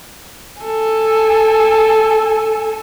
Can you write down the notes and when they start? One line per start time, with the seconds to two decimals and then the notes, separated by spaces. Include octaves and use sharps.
0.62 A4 G#5